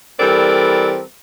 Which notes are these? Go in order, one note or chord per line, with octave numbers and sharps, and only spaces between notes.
E3 G3 C4 A4 A#4 D5